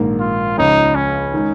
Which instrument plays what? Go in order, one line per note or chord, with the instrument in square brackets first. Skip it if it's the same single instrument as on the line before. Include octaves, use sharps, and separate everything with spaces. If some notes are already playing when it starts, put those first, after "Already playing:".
Already playing: [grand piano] A#1 G#2 D#3 A#3
[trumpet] F4
[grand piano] C#2 C#3 F3 C#4 G#4 [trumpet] D#4
[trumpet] C#4
[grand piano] D#3 G#3 D#4